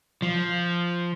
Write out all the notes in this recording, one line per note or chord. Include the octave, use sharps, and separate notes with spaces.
F3